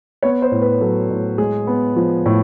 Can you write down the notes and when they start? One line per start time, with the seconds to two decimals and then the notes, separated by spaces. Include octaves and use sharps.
0.23 B3 C#5
0.42 C5
0.52 A2
0.61 B4
0.81 F#3 A4
1.10 A2
1.38 G#3 G#4
1.67 B3
1.96 F3
2.26 A2